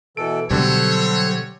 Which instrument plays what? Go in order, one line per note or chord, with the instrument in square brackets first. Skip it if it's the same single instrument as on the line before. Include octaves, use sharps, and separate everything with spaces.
[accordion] B2 E3 A4 [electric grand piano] D7
[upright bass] B2 F#3 [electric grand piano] D3 G3 [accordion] A4 C5 [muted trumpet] C#5